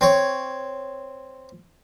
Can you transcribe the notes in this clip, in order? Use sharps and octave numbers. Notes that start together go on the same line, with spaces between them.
C4 C#5